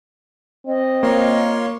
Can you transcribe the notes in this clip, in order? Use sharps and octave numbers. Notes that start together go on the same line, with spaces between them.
C4 D#5
A#3 F4 C#5 C6